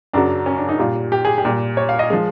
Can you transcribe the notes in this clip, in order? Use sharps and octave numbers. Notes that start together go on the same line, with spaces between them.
F#2 C#3 F#3 D4
C#4
D4
D#4
A#2 G3 F4
G4
G#4
G4
A#2 G3
C#5
F5
D#5
F3 G#3